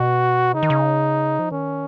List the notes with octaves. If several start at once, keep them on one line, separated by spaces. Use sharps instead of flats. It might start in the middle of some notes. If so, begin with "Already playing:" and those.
Already playing: B2 F#4
C#3 D#4
D#3
C#3
F3
D#3 C#4